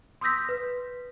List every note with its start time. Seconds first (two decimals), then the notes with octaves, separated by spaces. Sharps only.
0.21 C6 D#6 E6 G6 A#6 B6
0.49 B4